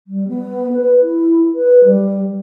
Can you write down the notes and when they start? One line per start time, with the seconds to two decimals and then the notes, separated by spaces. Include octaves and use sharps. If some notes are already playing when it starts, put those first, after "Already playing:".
0.07 G3
0.28 B3
0.72 B4
1.01 E4
1.54 B4
1.84 G3